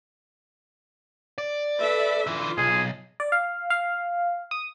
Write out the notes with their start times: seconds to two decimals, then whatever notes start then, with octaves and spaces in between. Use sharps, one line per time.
1.38 D5
1.79 A4 B4 E5
2.27 D3 E3 F4
2.58 B1 G#4
3.20 D5
3.32 F5
3.70 F5
4.51 D#6